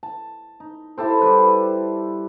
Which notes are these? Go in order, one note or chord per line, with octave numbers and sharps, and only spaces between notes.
A5
D#4
E4 G4 A4 C5
G3 B4 C5